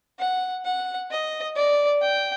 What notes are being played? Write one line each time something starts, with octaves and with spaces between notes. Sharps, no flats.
F#5
F#5
D#5
D5
G5